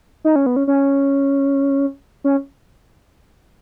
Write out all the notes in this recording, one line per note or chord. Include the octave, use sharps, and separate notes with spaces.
D#4
C#4
B3
C#4
C#4
C#4